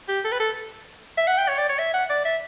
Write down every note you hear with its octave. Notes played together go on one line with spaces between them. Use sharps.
G4
A4
B4
A4
E5
F#5
G5
C#5
D5
C#5
E5
F#5
D5
E5